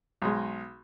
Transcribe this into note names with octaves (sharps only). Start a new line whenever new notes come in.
B1 G#3